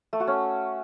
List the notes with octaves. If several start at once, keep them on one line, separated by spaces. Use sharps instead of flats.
A3
F#4
C#4